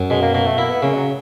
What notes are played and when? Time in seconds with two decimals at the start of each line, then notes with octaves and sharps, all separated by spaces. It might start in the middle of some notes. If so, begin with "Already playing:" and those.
Already playing: F#2
0.10 B2 G#3
0.22 A#3
0.34 B2 A#3
0.46 A3
0.57 A#3 E4
0.71 B3
0.82 C#3 A#3
0.94 F#3